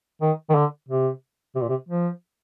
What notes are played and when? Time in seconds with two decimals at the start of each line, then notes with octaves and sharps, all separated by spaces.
0.21 D#3
0.50 D#3
0.55 D3
0.89 C3
1.55 C3
1.62 A#2
1.69 C3
1.89 F3